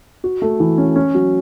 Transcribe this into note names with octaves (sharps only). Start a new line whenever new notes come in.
F#4
A3
E3
C#4
C#4
F#3